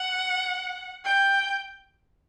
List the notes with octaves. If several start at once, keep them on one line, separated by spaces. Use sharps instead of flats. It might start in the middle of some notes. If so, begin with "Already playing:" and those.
Already playing: F#5
G5